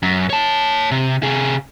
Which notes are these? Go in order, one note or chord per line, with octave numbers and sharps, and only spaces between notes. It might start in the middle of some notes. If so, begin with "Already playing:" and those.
F#2
C#5 A5
C3
C3 G#4